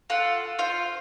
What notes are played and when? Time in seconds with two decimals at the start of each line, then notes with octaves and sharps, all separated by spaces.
0.10 F4 A4 F#5
0.59 F4 C5 F5